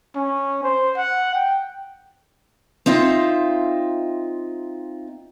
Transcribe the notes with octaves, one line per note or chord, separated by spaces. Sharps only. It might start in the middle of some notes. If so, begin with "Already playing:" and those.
C#4
C5
F#5
G5
C4 D#4 F4 E5